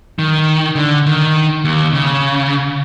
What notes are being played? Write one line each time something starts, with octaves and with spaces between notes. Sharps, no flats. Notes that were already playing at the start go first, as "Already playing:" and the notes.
D#3
D3
D#3
D#2
C#3